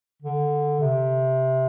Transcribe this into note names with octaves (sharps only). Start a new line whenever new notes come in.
D3
C3